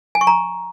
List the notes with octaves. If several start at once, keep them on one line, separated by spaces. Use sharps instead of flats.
G#5
C#6
A#5